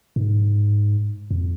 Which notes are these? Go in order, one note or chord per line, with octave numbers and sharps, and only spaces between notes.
G#2
F2